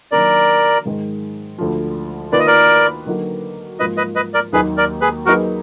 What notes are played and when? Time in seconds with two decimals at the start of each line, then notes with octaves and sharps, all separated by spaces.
0.12 D#3 F#3 A#3 D4 A#4 D5
0.85 G#2 D#3 G#3
1.58 D2 D3 F3
2.32 D#3 A#3 F4 B4 D5
2.40 D#5
2.47 A#4 D5
3.06 D3 F#3 A#3 D#4 F#4
3.79 G#2 F3 A#3 F4 B4 D#5
3.97 B4 D#5
4.16 B4 D#5
4.34 A#4 D5
4.53 D#2 D#3 F#3 A#3 D#4 G#4 B4
4.77 A#4 D5
5.01 G#4 B4
5.26 F#3 A#3 D#4 F#4 G#4 A#4 B4